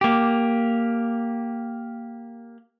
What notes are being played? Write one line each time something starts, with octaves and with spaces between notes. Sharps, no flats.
A#3 G4